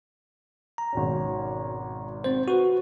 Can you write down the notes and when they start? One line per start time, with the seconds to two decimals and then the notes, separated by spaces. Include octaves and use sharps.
0.78 A#5
0.93 G#1 B2 C#4
2.24 C4 C5
2.48 F#4 B4